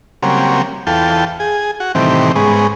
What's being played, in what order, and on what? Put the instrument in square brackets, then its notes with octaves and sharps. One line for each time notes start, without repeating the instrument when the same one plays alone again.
[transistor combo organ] C#3 F#3 G3 A#3 C4
E2 F4 A4 G5
G#4
F#4
A2 C3 D#3 E3 G3 C4
G#2 G#3 B3 C#4